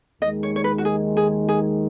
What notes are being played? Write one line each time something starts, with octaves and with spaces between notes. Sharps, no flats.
D#2 D#3 G#3 D#5
C#5
C#5
B4
F#4
G#4
G#4
G#4